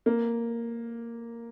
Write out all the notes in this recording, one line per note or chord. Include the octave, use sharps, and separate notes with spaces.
A#3